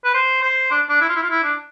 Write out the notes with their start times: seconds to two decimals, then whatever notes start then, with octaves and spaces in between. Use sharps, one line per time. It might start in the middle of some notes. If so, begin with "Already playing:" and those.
0.04 B4
0.14 C5
0.43 C5
0.71 D4
0.89 D4
1.01 E4
1.09 F4
1.16 E4
1.23 F4
1.30 E4
1.44 D4